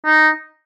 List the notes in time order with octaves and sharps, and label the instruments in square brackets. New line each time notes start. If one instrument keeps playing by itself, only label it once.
[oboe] D#4